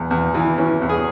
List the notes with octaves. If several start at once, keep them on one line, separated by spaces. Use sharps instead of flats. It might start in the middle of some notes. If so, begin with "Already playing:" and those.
Already playing: E2
E2
E3
E3 C#4
E2
G#4